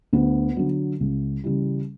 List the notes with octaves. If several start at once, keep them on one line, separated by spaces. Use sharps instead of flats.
D2 B3
D3 F#3
C#2
C#3 E3 G3